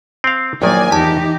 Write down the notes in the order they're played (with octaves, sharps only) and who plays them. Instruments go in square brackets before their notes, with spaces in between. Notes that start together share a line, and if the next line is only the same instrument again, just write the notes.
[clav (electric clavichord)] C4 F5
[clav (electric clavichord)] A#1 D#3 [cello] F#3 A#3 [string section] D5 G#5
[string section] E2 [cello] D#4 G4 [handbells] A5